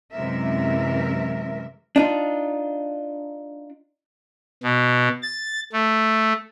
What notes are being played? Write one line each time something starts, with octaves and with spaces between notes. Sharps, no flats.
F#2 C3 E3 G#3 A#4 E5
D4 D#4 F4
B2
A6
A3